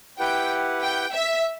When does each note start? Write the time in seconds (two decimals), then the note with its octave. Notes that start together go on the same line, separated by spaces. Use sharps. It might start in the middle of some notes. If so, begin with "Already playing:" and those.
0.19 E4 G4 B4 F#5 G5
0.82 G5
1.12 E5